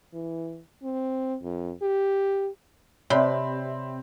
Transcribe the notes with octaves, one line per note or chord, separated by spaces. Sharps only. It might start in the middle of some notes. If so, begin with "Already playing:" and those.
E3
C4
F2
G4
C3 C4 C#5 D5 A5 B5